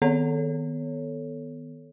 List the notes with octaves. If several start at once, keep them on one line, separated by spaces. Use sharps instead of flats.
D#3 B3 A4 C#5